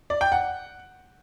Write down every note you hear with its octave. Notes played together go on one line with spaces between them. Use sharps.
D5
G5
F#5